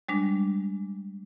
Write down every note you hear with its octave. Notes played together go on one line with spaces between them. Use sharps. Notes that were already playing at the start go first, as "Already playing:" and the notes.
G3 G#3 D4